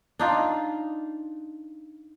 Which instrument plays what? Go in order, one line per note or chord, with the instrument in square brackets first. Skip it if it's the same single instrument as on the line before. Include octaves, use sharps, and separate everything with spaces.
[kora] D4 D#4 F4